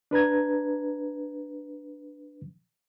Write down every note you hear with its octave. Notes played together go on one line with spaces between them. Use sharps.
D4 B4 A#5 G#6